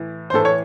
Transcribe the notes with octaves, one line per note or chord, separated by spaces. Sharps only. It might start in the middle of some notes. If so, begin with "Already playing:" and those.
Already playing: A2 E3
C5
A2 E3 A4
C#5